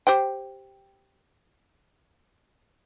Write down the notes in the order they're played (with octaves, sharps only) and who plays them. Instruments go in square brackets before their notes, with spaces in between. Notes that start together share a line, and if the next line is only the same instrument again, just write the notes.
[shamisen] G4 C5 G5